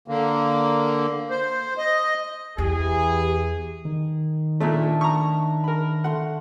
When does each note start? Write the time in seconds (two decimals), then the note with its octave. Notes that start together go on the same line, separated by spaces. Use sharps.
0.08 D3 A#3
1.30 C5
1.78 D#5
2.58 E2 E3 G4 G#4
3.85 D#3
4.60 A#2 A3 D4 E5
5.01 A#5 C#6
5.64 A#4 B5
6.04 A3 F#5 C6